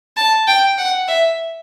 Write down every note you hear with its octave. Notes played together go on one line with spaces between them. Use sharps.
A5
G5
F#5
E5